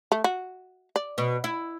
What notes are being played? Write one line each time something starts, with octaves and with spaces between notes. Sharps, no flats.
A3
F#4
D5
B2
E4